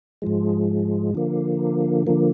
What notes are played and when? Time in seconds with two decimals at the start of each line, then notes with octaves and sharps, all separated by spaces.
0.22 G#2 F3 G#3
1.14 D3 F3 A#3
2.07 D3 F3 A#3